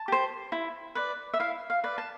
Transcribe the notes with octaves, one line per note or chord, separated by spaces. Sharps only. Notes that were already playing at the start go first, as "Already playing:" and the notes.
Already playing: A5
G4 C5
E4
B4 D5
E5
E4 F5
F5
B4 D5
A5